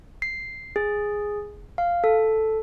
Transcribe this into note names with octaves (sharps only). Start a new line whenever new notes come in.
C7
G#4
F5
A4